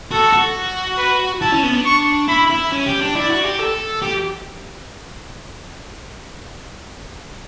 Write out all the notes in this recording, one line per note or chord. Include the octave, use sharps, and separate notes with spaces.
F#4 A4
F#4
B4
E4 A5
C#4
B3
D4
C#6
E4 B5
E4
C#4
G4
D4
E4 D5
F#4
G4
A4
G4